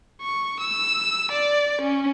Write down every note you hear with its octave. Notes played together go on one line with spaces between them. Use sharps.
C#6
E6
D5
C#4